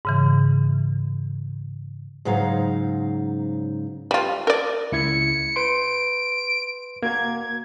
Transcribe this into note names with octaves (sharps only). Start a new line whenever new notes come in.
G#2 C#3 E3
G#2 C#3 F#3 D#4 C5 F5
G3 F4
A#4 D5
C#2 E4 G#6 C#7
B4 C6 D7
A#3 F#4 A#4 G#6